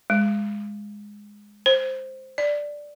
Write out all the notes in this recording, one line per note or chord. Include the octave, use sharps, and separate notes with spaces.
G#3
C5
D5